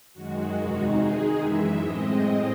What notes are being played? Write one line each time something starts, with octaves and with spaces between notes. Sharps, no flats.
F#2 D#3 G#3 F#4
E2 C3 D#3 G#3 D#4 F#4
D#3 G#3 D#4 G#4
F#2 E3 G#3 E5
A2 G#3 C4 D#5